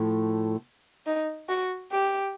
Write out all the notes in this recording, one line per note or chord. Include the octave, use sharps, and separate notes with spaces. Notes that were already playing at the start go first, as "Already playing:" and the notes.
Already playing: A2 F3 A3
D#4
F#4
G4